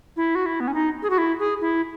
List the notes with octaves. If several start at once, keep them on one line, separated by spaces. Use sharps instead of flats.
E4
F#4
E4
B3
C#4
D#4
G#4
F#4
E4
G#4
E4